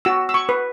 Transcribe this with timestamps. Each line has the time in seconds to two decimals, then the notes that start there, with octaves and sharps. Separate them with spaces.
0.05 F#4 E6
0.29 E6
0.34 C#6
0.49 B4